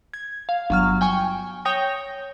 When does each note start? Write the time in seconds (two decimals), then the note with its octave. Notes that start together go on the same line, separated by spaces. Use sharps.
0.14 G#6
0.49 F5
0.70 G1 F#3 F6
1.01 G5 G#5 C#6
1.65 C#5 G5 D#6 G6 A#6